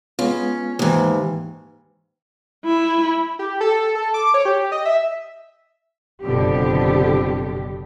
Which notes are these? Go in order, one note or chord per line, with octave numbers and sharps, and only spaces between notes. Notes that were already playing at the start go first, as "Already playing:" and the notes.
G#3 B3 C#4 F4
D#2 G#2 E3
E4
G4
A4
A4
D6
C#5
G4
D#5
E5
F#1 F2 B2 D3 G4